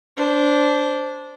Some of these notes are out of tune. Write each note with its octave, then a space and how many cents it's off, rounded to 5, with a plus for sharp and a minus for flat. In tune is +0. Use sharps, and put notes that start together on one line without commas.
D4 -15 C5 +0